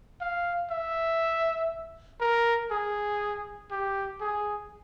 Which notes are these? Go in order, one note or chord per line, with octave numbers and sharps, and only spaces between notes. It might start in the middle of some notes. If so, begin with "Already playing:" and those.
F5
E5
A#4
G#4
G4
G#4